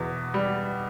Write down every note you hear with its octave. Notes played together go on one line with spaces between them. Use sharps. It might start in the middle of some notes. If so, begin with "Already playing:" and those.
Already playing: E2 B2
G3